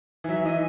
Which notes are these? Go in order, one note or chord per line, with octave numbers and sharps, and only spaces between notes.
E3
F#3 E5
E3 D#5